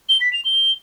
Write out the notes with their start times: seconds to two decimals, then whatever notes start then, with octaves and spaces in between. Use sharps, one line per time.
0.09 G7
0.21 B6
0.33 F7
0.45 G7